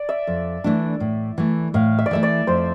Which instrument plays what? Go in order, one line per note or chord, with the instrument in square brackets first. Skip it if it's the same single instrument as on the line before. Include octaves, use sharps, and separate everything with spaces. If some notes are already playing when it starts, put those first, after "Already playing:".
Already playing: [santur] D5
E5
[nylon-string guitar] F2
E3 A3 D4
A2
E3 A3
[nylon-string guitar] A2 [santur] F5
[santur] E5
D5
[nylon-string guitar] E3 A3 [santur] E5
[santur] D5
[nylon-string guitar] F2 [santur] C5